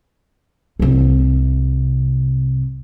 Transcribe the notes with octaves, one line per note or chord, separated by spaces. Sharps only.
C2 C3